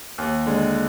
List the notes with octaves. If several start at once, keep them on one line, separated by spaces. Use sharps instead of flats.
D#2
D3 G#3